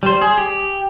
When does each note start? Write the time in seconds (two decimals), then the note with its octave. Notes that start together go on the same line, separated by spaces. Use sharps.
0.03 G3 C5
0.22 G#4
0.38 G4